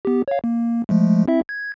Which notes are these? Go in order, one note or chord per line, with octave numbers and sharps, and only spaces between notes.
B3 G4
C#5 F5
A#3
F3 G#3 A3
C4 E4 E5
G#6